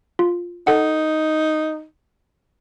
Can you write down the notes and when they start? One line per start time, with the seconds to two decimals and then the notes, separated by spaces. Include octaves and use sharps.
0.19 F4
0.67 D#4 A4 F#5